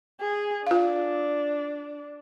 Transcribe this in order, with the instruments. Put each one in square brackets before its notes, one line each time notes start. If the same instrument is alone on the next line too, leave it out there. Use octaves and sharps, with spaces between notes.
[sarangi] G#4
[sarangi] D4 [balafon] F4 F5